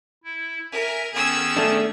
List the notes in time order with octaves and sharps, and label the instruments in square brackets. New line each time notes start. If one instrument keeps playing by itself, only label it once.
[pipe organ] E4
[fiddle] A#4 [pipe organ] E5 G#5
[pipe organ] D#3 B3 C#4 [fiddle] G#4 E6
[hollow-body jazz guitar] A3 D4